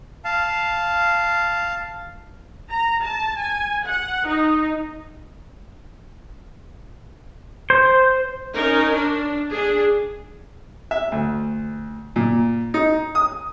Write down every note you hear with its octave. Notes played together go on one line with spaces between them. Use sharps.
F5 A5
A#5
A5
G#5
F#5
D#4
C5
C#4 D#4 A#4
D4
D4 G#4
E5
D2
A#2
D#4
D#6